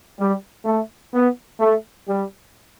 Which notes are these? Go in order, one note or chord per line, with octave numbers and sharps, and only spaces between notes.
G3
A3
B3
A3
G3